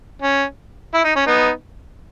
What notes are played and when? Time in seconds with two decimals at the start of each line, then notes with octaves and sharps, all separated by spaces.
0.22 C#4
0.94 E4
1.04 D#4
1.16 C#4
1.27 B3 D#4